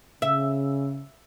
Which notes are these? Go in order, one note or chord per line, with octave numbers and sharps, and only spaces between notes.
C#3 E5